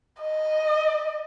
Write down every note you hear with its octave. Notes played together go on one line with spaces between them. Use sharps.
D#5